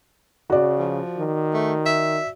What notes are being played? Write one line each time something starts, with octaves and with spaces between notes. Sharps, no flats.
C#3 F#4 D5
F3
D#3
A3
E5